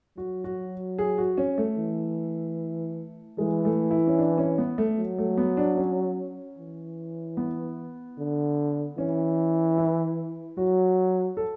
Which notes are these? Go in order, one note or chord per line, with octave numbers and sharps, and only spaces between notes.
F#3 F#4
F#4
G#4
F#4
C#4
A3
E3
E3 G#3
A3
E4
C#4
D4
C#4
B3
A3
F#3
A3
B3
D4
C#4
E3
B3
D3
E3 C#4
E4
F#3 F#4
A4